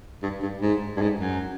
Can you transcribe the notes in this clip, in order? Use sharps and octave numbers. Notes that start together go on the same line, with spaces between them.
G2
G2
G#2
G2
G#2
F#2